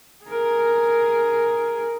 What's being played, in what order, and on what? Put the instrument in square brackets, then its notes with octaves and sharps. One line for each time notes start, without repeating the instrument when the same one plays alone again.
[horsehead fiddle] G#4 A#4